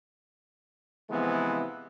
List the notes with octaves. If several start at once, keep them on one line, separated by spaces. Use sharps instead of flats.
C3 E3 F3 G#3 B3